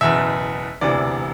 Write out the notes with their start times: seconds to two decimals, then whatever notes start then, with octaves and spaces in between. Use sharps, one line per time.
0.01 F#1 E2 B2 E5
0.81 E1 D2 C3 E3 D5